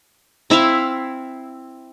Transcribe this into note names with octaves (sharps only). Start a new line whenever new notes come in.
C4 E4 E5 F5